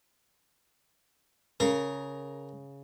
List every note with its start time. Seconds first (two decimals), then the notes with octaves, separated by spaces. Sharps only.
1.60 C#3 A#4